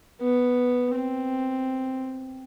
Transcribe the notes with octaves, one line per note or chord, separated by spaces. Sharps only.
B3
C4